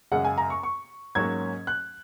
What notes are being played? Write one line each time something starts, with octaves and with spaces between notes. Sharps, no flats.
F#2 C#3 G#3 F#5
G#5
A#5
C#6
C#6
G#2 F#3 A#3 C#4 G#6
F#6